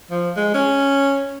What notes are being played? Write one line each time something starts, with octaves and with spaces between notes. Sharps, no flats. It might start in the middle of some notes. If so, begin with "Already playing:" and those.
F3
G#3
C#4